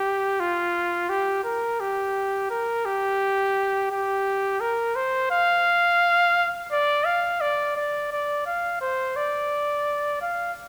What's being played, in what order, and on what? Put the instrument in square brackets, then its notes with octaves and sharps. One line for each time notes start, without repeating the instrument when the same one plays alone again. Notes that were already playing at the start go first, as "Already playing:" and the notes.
Already playing: [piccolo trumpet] G4
F4
G4
A#4
G4
A#4
G4
G4
A#4
C5
F5
D5
F5
D5
D5
D5
F5
C5
D5
F5